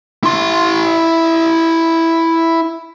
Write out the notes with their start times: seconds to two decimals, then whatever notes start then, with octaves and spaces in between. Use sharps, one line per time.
0.24 E4 C6